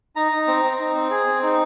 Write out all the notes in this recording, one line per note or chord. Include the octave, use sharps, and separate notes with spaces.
D#4 A#5
D#4
C4
C4
D#4
C4
G#4
C4
D#4